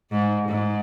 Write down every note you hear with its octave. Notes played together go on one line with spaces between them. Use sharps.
G#2
G#2